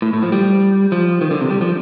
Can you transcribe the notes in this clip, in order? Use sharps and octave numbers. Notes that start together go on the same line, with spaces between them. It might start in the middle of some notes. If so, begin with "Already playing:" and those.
A2
A2
F3
G3
F3
D#3
D3
C3
G3
F3